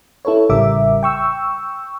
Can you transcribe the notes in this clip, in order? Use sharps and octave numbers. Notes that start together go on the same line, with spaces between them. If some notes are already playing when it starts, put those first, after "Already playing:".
E4 A4 B4 C#5
A1 C#3 G3 A#4 E5 D6
G5 C#6 E6